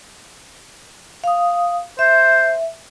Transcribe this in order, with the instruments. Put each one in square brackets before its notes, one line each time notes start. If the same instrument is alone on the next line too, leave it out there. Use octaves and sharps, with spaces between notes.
[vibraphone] F5 D#6
[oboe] C5 [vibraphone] E5